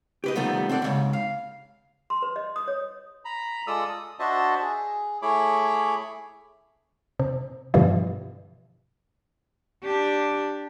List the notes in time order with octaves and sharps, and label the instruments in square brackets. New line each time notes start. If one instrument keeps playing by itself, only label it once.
[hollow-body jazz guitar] G4 B4 D#5
C3 D#3 F3 G3 A3 B3
C4 A4 D5 F#5
D#2 G#2 C#3
F5
[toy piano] C6
B4
D#5
D#6
C#5
[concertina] A#5 B5
G#3 F4 A4 D5 D#6 E6
D#6
D4 F#4 C5 D#5 E5 A5
G#4
A3 E4 G#4 C#5 B5 D6
[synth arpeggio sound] C3
G2 B2 D3 E3 F3
[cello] D4 G4